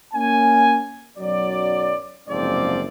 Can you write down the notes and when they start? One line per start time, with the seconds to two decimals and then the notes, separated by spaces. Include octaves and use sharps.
0.14 A#3 C#4 G#5
1.18 B1 F#2 F#3 D5
2.28 F#1 G#2 C3 F3 C4 D5